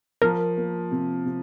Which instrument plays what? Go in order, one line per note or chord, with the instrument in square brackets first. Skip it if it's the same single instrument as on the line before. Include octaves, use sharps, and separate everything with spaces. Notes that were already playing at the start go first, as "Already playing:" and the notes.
[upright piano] F3 [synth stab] A#4
[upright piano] A#3
C3
C3